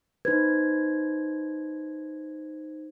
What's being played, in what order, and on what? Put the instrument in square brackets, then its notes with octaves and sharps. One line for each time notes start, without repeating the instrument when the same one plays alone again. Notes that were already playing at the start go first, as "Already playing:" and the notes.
[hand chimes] D#4 C5 G#6 [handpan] B4